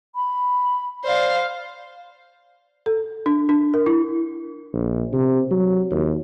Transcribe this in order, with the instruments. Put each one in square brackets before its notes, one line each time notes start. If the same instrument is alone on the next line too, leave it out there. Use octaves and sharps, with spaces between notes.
[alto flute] B5
[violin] C5 F5 [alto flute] D5
[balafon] A4
D4
D4
A#4
E4
[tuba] A#1
C3
F#3
D#2